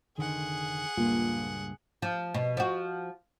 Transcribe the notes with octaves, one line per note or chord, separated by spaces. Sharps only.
F1 D3 D#3 G#4 F#5
C#2 G2 A#2 A#3 F4
F3
B2
F3 F#4